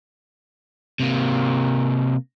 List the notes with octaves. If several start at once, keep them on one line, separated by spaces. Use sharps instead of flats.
C3 A#3